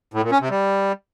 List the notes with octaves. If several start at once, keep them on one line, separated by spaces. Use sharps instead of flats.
A2
A#2
C#4
C3
G3